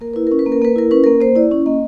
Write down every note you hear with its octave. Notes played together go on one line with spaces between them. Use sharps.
A#3 A#4
E4 B4
C#4 A#4
B4
A#3
A#4
A#3 B4
E4 A#4
C#4 B4
A#4
A#3
A#3 C5
E4 D5
C#4
A#3 D#5